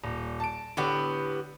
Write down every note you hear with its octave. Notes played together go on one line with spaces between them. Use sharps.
D#1
A5 D7
A2 D3 B3 G4